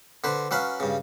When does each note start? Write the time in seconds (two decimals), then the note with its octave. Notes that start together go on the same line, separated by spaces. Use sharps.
0.24 D3 B4 C5
0.51 F#3 C#4 B4 F5
0.80 G2 C#3